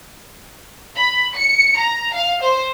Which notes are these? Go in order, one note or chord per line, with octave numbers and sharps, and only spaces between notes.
B5
C#7
A#5
F5
C5